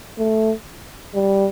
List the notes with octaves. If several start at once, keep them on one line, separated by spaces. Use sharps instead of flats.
A3
G3